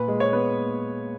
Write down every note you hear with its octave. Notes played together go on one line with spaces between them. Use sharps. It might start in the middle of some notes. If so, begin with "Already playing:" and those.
Already playing: A#2 B4
G#3
C#5
B3